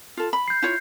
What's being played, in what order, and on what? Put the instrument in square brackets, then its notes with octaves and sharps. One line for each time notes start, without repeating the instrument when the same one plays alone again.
[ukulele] F4 A4
B5
[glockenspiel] G6 C7
[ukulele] E4 F4 C#5